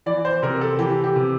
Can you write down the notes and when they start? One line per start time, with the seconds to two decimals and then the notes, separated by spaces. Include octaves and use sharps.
0.06 E3 D5
0.25 C5
0.43 C3 A#4
0.61 A4
0.79 E3 G4
1.04 G4
1.16 C3